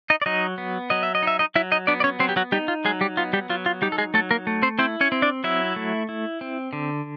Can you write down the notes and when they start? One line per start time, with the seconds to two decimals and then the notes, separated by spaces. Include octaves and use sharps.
0.10 D#4 D#5
0.22 D5
0.26 F#3 D#4 D#5
0.58 B3
0.90 F#3 D#5
1.03 E5
1.15 D#5
1.23 D#4 E5
1.39 D#4 D#5
1.55 F#3 E4 E5
1.72 D#4 D#5
1.87 B3 D4 D5
2.00 D5
2.04 C#4 C#5
2.20 F#3 C4 C5
2.29 G4
2.36 F#3 F#4
2.52 G3 D#4 G4
2.68 F4
2.85 F#3 G#3 G#4
3.01 G3 G4
3.17 B3 F4
3.33 G3 G4
3.50 F#3 F4
3.66 F4
3.82 G3 D#4 G4
3.92 A4
3.98 G#3 G#4
4.14 F#3 A3 A4
4.31 A#3 A#4
4.47 A3
4.62 C4 C5
4.79 C4 E4 C5
5.01 C#4 C#5
5.12 C4
5.22 D4 D5
5.44 F#3 E4 E5
5.76 A3
6.09 E4
6.41 C4
6.73 D3